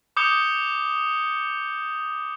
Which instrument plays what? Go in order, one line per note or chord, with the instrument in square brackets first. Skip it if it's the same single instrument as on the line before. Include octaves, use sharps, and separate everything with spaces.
[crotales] D6 D#6 G6 C#7 G7